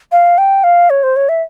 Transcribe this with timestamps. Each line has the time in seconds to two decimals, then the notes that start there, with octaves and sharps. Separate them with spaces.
0.12 F5
0.38 G5
0.64 F5
0.90 C#5
1.03 C5
1.16 C#5
1.29 E5